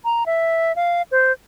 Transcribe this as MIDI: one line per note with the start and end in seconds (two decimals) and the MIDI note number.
0.05 0.26 82
0.26 0.75 76
0.76 1.02 77
1.11 1.32 72